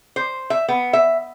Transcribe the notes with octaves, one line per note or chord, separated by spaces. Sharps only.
C5
E5
B3
E5